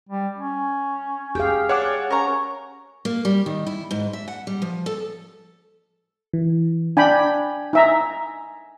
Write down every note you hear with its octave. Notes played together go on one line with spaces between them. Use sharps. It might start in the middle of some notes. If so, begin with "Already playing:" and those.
G3
C#4
G4 G#4 F5 G5
D4 C#5 F#5 D6
C#4 A#4 C#5 A#5
A#3
G3
D#3
E4
G#2
E5
F#5
G3
F3
A4
E3
D4 G5 G#5 B5
D#4 E5 A#5